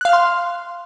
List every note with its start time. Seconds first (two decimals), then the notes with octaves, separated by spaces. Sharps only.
0.01 F#6
0.05 F5
0.09 F6
0.13 C6